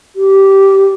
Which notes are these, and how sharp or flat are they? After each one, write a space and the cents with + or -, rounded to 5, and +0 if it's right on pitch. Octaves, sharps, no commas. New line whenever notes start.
G4 -10